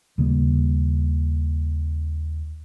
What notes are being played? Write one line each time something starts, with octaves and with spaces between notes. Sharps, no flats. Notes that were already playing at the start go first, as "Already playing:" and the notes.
D#2 C#3 G3 A#3